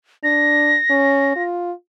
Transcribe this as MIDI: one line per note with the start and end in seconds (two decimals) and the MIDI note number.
0.24 0.77 62
0.24 1.43 94
0.90 1.32 61
1.36 1.72 65